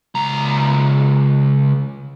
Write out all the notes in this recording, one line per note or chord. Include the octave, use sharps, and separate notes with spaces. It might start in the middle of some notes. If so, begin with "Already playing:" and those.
C#2 A#5